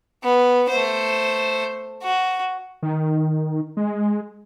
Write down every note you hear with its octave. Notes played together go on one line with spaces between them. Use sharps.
B3
A3 C5
F#4
D#3
G#3